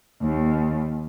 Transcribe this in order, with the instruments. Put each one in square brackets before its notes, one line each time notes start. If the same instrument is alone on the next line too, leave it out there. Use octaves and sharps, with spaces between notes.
[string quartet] D#2